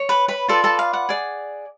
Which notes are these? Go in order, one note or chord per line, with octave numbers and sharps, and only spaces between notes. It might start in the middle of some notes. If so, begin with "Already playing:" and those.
Already playing: C#5
B4 B5
B4 B5
F4 A4 B4 D5 A5
A4 A5
F5
F#5
G#4 D5